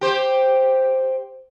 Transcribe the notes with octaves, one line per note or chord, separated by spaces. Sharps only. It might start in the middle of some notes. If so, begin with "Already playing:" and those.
G4 C5